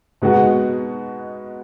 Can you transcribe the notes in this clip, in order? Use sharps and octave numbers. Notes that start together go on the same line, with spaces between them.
B2 G#3 B3 D#4 F#4